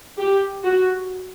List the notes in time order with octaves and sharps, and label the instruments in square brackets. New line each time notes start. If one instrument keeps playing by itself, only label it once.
[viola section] G4
F#4